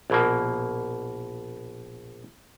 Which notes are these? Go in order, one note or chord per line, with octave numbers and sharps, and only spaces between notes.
A#1 B2 A#3